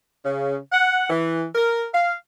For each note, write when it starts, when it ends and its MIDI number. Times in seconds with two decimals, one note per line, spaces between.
0.24 0.56 49
0.72 1.05 78
1.10 1.46 52
1.55 1.86 70
1.93 2.13 77